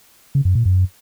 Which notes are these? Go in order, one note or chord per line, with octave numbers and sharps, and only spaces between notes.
C#3
F#2
A#2
F#2